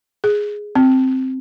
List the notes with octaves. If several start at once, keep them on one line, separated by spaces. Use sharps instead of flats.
G#4
C4